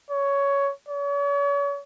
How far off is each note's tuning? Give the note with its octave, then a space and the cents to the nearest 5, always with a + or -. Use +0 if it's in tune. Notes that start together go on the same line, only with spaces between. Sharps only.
C#5 +10
C#5 +40